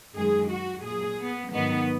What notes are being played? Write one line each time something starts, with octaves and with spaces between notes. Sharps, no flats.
F#2 D#3 G#3 G#4
F#4
A#2 F#3 G#4
B3
G#2 D#3 F#3 B3